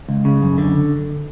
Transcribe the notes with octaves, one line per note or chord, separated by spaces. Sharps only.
C#2
C#3
F#2
D3